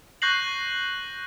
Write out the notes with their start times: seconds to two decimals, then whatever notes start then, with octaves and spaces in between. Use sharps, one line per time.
0.22 C#6 F#6 G6 A#6 C7 F#7